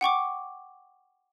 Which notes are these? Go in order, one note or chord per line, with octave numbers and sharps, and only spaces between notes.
F#5 G5 C#6 D6